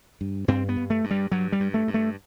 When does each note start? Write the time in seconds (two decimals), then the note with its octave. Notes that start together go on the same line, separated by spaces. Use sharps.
0.21 G2
0.48 G2 C4
0.69 B3
0.77 G2
0.90 A3
1.04 G2
1.11 G3
1.32 G2 F#3
1.52 G3
1.60 G2
1.74 A3
1.88 G2
1.94 A3